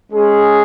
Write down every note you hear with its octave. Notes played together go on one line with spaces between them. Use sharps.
G#3 C#4 G#4